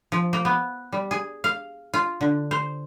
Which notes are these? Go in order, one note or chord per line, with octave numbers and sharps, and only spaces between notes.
F3
A#3
B3
G3
G#4
F5
F4
D3
C5